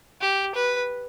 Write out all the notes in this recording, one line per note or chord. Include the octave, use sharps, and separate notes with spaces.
G4
B4